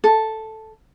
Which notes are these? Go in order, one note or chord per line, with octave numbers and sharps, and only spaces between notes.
A4